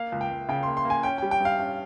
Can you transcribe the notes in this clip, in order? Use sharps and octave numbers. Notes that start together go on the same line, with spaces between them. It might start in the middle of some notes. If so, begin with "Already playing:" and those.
Already playing: A#3 F5
C#2
G5
C#2
C#3 G5
C6
A#3
C6
A#3
G#5
C#4 G5
G5
G3
G5
G2 F5
C#4